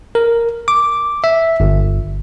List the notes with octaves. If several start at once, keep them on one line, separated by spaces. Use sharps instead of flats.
A#4
D6
E5
G1